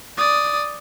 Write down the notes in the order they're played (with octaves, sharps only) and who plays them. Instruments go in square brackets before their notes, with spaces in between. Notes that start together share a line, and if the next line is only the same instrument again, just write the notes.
[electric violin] D5 D#6